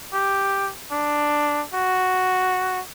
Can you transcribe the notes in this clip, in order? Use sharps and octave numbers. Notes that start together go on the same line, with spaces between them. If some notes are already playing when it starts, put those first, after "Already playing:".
G4
D4
F#4